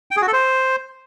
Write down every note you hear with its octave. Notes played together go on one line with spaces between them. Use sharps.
G5
G#4
F#4
A4
C5